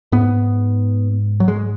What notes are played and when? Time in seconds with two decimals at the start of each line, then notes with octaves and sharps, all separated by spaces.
0.12 G#2 B3
1.40 F#3
1.48 G#3